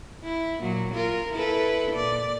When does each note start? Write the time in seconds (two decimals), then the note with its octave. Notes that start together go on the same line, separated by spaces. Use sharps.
0.24 E4
0.60 A#2 F#3
0.94 F4 A#4
1.33 E4 A4 B4
1.91 A#2 D5